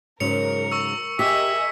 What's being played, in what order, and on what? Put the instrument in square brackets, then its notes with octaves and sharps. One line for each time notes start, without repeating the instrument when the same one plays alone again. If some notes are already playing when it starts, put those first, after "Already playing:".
[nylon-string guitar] G#2 C#3 F#3 [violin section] A#4 [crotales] C#7 F7
[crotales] C#6 E6
[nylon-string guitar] G4 [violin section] G#4 A#4 D#5 [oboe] E5 [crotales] E6 B6